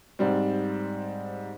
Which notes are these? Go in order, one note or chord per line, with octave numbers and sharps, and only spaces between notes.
G#2 G3 C4